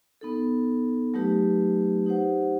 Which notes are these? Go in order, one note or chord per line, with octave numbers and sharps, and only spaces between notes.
B3 D#4 A4
F#3 A3 D#4 G4 B4
D#4 G4 C5 F#5